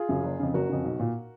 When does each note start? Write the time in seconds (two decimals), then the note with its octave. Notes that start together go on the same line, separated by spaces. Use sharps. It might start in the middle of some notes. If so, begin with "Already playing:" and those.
Already playing: F4 G#4
0.09 F#2 C#3
0.23 F#1
0.40 F2 C#3
0.54 F#1 F#4 A#4
0.69 F2 C#3
0.84 B1
1.00 A#2